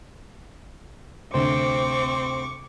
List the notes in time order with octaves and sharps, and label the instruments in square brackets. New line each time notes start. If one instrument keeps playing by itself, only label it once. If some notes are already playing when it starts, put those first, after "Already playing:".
[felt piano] D2 C3 [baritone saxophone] C4 [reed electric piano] C5 [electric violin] C#6 D6